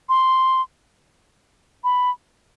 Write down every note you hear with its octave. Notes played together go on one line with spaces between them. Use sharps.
C6
B5